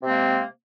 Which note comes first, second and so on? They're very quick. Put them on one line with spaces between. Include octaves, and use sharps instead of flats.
C3 C4 G#3 A#3